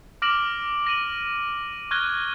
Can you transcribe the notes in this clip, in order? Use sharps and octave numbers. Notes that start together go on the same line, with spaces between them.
D6 F6 A#6 D7 E7 F#7
A#6 D#7 F#7
C#6 F6 F#6 G#6 A#6 G7